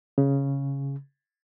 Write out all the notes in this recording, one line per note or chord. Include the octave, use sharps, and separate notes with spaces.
C#3